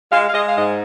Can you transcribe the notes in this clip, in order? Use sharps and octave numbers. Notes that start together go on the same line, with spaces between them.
G#3 F5
F5
G#3 D#5
F5
G#2 D#5